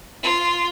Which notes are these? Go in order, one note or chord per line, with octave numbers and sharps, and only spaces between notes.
F4